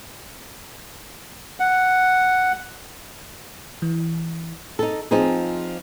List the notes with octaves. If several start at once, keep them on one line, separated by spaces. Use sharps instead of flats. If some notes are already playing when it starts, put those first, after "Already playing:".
F#5
E3
D#4 A4
F3 C4 D#4 F4 G#4